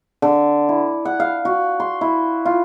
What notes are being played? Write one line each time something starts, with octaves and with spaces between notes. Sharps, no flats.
D3
E4
F#5
F5
F#4
C6
E4
F4